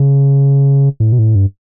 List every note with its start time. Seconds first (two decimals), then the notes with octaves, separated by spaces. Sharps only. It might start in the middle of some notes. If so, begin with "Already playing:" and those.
Already playing: C#3
1.00 A2
1.12 B2
1.19 A2
1.35 G2